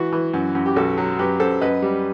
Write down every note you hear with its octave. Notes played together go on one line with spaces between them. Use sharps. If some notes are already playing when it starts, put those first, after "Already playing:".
Already playing: E3 F#4
E3
F#2
F#2
G4
B1 F#4 A4
F#3
F#2 G4 B4
F#2 A4 C5
F#2 B4 D#5
G3